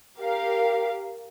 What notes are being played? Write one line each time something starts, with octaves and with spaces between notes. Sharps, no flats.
G4 A#4 F5